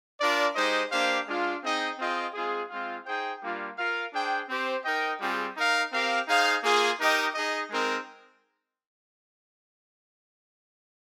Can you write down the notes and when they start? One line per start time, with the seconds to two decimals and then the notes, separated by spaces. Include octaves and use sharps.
0.20 D4 F4 A#4 D5
0.56 G#3 D#4 G4 C5 D#5
0.91 A#3 D4 G4 C5 F5
1.27 G#3 D4 F4
1.63 C4 D#4 G#4 D#5 G5
1.99 C4 F4 G#4 D#5 G5
2.34 G#3 C4 F4 G#4
2.70 G#3 C4 F4
3.06 D#4 G#4 C5 G5
3.42 G3 A#3 D4 F4
3.78 F4 A#4 F5
4.13 D4 G#4 C5 G5
4.49 C4 G4 C5
4.84 D#4 A#4 D#5 G5
5.20 G3 C4 F4 G#4
5.56 D#4 A#4 F5
5.91 C4 G4 A#4 F5
6.27 D#4 G#4 C5 F5
6.63 A#3 F4 G#4
6.99 D#4 G4 A#4 D#5 G5
7.34 D#4 G#4 D#5
7.70 G#3 C4 D#4 A#4